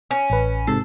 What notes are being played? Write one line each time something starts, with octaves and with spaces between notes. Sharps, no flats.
C#4
A1 B4
G#2 C3 A4 C7